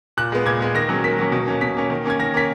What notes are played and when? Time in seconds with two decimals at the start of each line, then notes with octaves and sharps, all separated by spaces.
0.17 A#2 F#6
0.32 G#3 B3
0.46 A#2 G#6
0.60 G#3 B3
0.75 D#3 A#6
0.89 F#3 A#3 C#4
1.04 D#3 B6
1.18 F#3 A#3 C#4
1.32 B2
1.48 A#3 C#4
1.61 B2 B6
1.77 A#3 C#4
1.90 D#3
2.05 A#3 C#4 G#6
2.19 D#3 A#6
2.34 A#3 C#4 B6